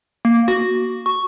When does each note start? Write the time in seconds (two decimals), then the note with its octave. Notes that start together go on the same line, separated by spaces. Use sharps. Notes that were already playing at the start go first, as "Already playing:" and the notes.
0.25 A#3
0.48 F#4
1.06 C#6